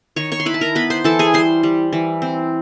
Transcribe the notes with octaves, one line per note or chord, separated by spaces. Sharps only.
D#3 C#5 C#6
C#5 C#6
C6
E4 B4 B5
A5
A#4 A#5
B3 B4 B5
C5 C6
E3 A4 A5
G#4 G#5
G3 C5 C6
G3
E3
C4